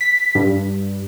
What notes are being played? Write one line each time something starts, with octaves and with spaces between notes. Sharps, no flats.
B6
G2